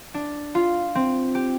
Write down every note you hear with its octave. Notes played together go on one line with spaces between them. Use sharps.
D4
F4
C4
G4